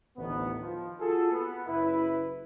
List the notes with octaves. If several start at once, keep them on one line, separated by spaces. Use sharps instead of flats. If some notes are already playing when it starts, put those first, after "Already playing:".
A1 D2 D#3 B3
D#3 F3
F4 F#4 G#4 A4
B3
F#1 E4 B4